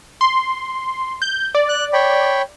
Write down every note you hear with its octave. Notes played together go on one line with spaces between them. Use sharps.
C6
G6
D5
F#6
C#5 G5 B5